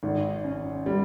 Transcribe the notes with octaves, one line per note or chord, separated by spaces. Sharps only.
G#1
C#4
G3